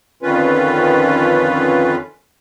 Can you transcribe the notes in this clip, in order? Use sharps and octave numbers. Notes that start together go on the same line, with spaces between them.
F2 D3 D#3 C#4 F4 B4